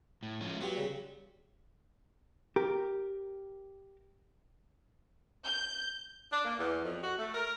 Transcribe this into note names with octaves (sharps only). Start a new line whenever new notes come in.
A2
F3 G#3 C#4
F#3 B3 F4 G4
C#3 G3
G4 A#4
G6
D4
A#3
E2
F2
F#4
A3
A#4